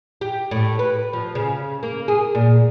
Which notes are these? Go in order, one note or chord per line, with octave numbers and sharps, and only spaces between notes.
G4
A2
B4
F3
C#3
A#3
G#4
A#2